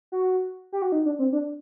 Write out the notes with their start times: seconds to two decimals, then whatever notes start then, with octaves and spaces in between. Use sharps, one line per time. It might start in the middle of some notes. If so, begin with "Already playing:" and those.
0.12 F#4
0.72 G4
0.82 F#4
0.92 D#4
1.05 D4
1.19 C4
1.32 D4